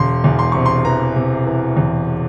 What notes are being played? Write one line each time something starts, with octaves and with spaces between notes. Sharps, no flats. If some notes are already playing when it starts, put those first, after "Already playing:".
Already playing: E1 C6
E2
C6
C3 C#6
C6
E3 A#5
C3
E3
E2